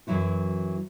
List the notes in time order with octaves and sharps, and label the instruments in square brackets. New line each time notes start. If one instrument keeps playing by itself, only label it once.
[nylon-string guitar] F#2 E3 F#3 E4 F#4